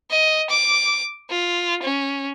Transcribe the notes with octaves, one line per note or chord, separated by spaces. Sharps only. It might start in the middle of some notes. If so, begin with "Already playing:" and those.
D#5
D6
F4
C#4